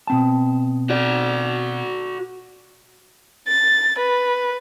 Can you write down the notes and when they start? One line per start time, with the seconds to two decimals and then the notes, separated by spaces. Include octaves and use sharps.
0.07 B2 C4 A5
0.90 F#4 D5
3.48 A6
3.99 B4